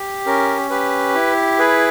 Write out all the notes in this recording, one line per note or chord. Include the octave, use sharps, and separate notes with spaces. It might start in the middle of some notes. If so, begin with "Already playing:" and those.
Already playing: G4
C#4 A#4
G4 B4
E4
G#4 B4